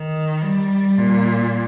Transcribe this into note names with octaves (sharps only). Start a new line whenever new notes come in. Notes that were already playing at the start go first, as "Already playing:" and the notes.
Already playing: D#3
G3
A#2